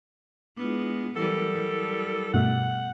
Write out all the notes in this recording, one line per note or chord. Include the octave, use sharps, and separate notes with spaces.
G#3 B3 D4 E4 F4
E3 F#3 G3 E4 A4 A#4
G3
G2 B2 A3 F#5